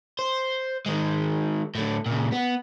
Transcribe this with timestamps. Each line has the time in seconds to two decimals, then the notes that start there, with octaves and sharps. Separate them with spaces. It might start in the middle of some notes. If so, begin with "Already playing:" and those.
0.19 C5
0.86 D#3 G#3
1.75 A2 D3
2.06 A#2 C#3
2.32 B3